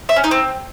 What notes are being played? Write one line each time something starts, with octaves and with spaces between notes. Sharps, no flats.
E5
C#4
D#4
C4